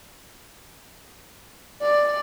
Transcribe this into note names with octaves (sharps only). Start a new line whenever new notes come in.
D5